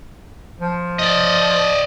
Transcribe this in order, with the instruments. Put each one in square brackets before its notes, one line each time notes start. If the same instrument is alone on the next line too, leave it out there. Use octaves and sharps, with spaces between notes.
[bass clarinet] F3
[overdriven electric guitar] D5 D#5